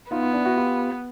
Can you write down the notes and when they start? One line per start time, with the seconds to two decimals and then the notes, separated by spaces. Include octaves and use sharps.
0.11 B3 D#4 F4
0.22 D#4 F4
0.33 D4 E4
0.45 E4 F#4
0.56 F4 G4